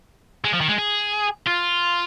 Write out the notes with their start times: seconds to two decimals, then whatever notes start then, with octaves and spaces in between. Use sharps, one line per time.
0.45 G#3
0.53 F3
0.61 D#3
0.69 G#3
0.78 G#4
1.47 F4